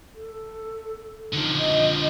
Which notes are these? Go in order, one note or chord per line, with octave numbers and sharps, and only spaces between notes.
A4
D3 F3 D#4
D#5